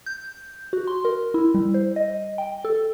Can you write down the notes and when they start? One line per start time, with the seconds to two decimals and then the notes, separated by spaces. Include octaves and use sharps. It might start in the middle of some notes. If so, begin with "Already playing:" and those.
0.06 G6
0.73 F#4
0.87 C6
1.05 A#4
1.34 E4
1.55 G3
1.74 C5
1.96 D#5
2.38 G5
2.65 A4